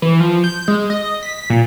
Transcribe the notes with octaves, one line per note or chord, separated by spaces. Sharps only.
E3
F3
G6
G#3
D#5
B6
A#2